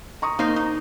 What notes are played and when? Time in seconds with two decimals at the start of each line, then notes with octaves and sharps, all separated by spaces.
0.22 A#5 C#6 D#6
0.39 A#3 D#4 C5
0.56 D#4